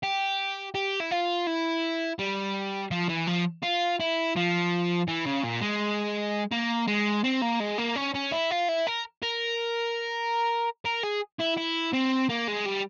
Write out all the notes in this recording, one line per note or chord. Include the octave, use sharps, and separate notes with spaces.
G4
G4
E4
F4
E4
G3
F3
E3
F3
F4
E4
F3
E3
C#3
A#2
G#3
A#3
G#3
C4
A#3
G#3
A#3
C#4
C#4
E4
F4
E4
A#4
A#4
A#4
G#4
E4
E4
C4
A#3
G#3
G3